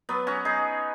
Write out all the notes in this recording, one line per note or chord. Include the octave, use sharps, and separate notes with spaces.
F#3 B3
C#4 F#4
D#4 G#4